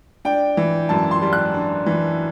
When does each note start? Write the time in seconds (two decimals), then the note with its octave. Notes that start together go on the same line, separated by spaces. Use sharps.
0.25 D4 G5
0.57 E3
0.89 F#2 A5
1.11 C6
1.22 G3
1.33 F#6
1.54 D4
1.86 E3